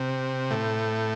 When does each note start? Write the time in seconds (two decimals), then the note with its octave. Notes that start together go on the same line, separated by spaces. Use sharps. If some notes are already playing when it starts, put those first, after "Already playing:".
Already playing: C3
0.50 A2